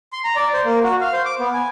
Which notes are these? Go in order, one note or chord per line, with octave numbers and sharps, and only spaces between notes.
C6
A#5
D5
C5
A#3
F#4
F5
C5
D6
B3
G#5